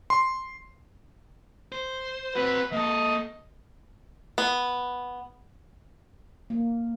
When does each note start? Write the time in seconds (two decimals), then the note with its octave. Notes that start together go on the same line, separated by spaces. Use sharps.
0.10 C6
1.72 C5
2.35 C4 F#4 B4
2.73 A#3 A4 D#5
4.38 B3
6.50 A#3